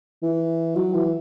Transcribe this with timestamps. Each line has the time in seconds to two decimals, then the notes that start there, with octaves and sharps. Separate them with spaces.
0.22 E3
0.76 F#3
0.94 E3